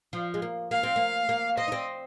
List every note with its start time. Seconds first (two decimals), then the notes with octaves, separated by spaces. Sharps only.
0.13 F3
0.34 G#3
0.42 A#3
0.71 A#3 F5
0.83 C4
0.96 A#3
1.29 A#3
1.57 C4 D#5
1.68 D#4
1.72 C4